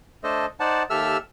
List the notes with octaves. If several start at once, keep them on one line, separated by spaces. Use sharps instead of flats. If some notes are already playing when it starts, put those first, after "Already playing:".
A3 D4 A4 C5 D#5
D#4 C5 D5 F#5 A5
D#2 G4 A4 E5 E6 F6